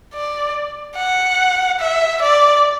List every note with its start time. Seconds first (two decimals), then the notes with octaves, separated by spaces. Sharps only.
0.14 D5
0.96 F#5
1.79 E5
2.22 D5